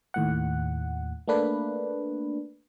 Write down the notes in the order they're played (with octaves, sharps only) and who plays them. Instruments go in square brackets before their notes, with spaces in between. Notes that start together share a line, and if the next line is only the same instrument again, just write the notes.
[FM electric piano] D#2 A2 F#5
A3 A#3 D4 B4